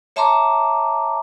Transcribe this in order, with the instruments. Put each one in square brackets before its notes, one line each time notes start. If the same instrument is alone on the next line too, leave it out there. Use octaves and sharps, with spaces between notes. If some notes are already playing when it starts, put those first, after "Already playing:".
[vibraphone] C#5 E5 A5 A#5 C6 D6